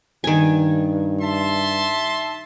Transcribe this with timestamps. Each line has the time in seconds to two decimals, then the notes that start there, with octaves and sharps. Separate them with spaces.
0.24 G2 D#3 G#5
1.20 E5 A5 C6